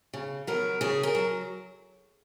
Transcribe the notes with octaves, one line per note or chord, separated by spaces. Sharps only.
C#3
F#3 B3 A#4
C#3 G#4
A#4
F#3